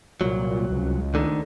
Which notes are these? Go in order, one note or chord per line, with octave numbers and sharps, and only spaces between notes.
C2 A#2 F#3
C#2
D2 D3 D#3